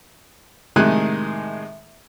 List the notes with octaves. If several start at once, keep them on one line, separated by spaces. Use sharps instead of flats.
A2 C3 D#3 G#3 G#5 F#6